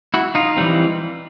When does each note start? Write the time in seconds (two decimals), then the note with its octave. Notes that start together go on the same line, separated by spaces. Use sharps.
0.14 E4 F#4
0.35 D#4 F4
0.57 E3 G3 C4